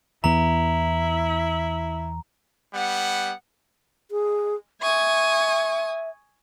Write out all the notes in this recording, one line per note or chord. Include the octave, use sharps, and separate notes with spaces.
E2 E3 B3 E4 A#5
G3 B3 F#5
G#4
E5 G#5 C#6 D#6